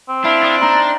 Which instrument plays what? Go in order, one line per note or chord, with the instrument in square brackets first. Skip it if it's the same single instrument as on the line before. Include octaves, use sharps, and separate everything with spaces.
[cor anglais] C4
[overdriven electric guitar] D4 [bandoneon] E4 F5
[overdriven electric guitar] D4 [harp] D#6
[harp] D#4 A#5 [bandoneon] C6